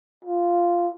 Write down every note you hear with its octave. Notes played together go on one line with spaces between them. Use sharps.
F4